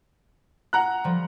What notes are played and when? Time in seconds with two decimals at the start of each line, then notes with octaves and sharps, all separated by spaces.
0.73 F#5 A#5 F#6
1.04 F3 G3